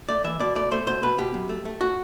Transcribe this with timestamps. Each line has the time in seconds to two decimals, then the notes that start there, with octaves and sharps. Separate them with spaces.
0.09 A3 D5
0.24 E3 E5
0.40 B2 D5
0.55 A3 D5
0.71 A3 C5
0.87 B2 C5
1.03 B2 B4
1.18 B2 G4
1.34 F#2
1.49 A3
1.65 A3
1.81 F#4